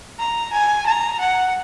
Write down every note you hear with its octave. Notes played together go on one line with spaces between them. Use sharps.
A#5
G#5
A#5
F#5